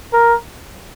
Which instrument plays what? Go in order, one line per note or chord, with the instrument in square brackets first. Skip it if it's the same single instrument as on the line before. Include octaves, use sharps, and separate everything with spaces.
[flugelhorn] A#4